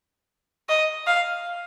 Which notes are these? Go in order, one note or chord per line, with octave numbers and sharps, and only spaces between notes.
D#5
F5